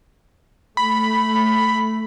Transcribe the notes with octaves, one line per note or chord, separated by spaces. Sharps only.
A3 B5